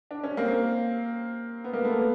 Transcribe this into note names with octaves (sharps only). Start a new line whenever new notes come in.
D4
C#4
A#3 C4
B3
A#3
A3 B3